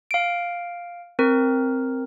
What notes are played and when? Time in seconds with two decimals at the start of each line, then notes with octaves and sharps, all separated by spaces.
0.11 F5 D7
1.19 C4 A#4